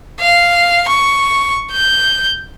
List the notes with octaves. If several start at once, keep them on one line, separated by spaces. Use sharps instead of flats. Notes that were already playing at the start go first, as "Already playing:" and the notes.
F5
C#6
G6